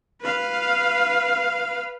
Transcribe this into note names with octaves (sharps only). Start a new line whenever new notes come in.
B4 F5